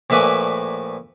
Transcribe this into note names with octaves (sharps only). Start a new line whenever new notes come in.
A#1 A2 E4 B4 D5 G#5